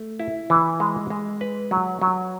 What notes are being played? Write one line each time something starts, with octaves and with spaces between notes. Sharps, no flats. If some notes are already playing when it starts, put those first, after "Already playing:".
Already playing: A3
E4
E3
G#3
G#3
B4
F#3
F#3